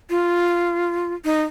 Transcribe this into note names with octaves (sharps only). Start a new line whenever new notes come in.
F4
D#4